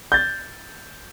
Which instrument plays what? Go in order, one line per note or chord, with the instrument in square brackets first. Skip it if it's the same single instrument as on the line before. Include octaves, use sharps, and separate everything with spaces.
[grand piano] G6 A6